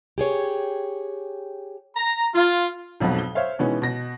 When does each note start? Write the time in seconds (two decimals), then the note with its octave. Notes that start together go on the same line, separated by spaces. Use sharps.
0.18 G4 G#4 C#5
1.97 A#5
2.35 F4
3.00 B1 F2 G#2 B2 F#3
3.18 G7
3.35 C5 C#5 E5 F5
3.59 B2 D#3 E3 G#3 B3 C#4
3.82 B2 A#6